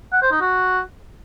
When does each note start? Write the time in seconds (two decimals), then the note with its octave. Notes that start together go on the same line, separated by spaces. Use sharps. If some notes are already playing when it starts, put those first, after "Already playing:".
0.13 F#5
0.22 C5
0.31 D#4
0.41 F#4